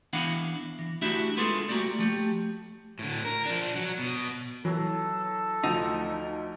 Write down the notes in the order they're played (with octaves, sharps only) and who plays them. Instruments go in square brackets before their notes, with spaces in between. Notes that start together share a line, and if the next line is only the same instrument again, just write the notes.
[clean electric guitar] E3 B3 D4 E4 F5 F#5
E3
A3 D4 E4 F#4 G4 E5
G#3 B3 F4 G#4 A4
G3 A3 A#3 F#4
F3 A3 G4
[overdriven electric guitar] A2 D3
A#4
F3 D4
F#3
B2
[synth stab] E3 [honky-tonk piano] F#3 [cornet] A4
[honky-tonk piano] D2 F3 [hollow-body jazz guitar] D#4